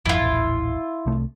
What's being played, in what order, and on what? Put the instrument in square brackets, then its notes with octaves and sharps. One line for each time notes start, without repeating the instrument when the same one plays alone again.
[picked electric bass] G#1 F2 F3 [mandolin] E4 F4
[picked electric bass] D#1 A1
C2 C3 A3